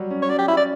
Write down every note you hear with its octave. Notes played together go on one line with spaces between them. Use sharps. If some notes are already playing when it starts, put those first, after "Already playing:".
Already playing: F#3 G3
C#4
C#5
F#3 D5
G4
C#4 E4
D5